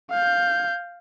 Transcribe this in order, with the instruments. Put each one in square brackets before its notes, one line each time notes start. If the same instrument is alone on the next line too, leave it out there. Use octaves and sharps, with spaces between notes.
[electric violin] F5 G6